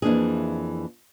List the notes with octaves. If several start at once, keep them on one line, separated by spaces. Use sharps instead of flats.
F2 E3 A#3 D4 G#4